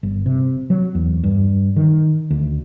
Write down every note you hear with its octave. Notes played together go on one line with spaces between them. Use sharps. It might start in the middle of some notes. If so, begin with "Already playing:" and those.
G1
C3
F#3
E2
G2
D#3
D2